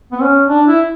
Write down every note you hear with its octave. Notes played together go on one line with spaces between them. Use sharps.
B3
C#4
D4
E4